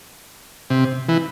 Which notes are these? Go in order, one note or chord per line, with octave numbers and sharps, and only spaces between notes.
C3
E3